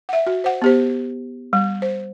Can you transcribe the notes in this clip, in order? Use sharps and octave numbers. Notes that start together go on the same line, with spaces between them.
E5 F#5
F#4
C5 F#5
B3 G4 C5
G3
C5